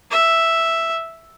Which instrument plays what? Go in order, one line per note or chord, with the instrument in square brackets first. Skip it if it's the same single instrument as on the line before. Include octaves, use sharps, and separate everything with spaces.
[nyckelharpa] E5